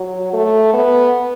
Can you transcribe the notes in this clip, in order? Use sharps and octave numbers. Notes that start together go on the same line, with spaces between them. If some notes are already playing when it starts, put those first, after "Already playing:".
Already playing: F#3
A3
B3